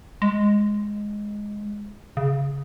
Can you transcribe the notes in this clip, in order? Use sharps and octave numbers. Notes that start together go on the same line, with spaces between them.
G#3
C#3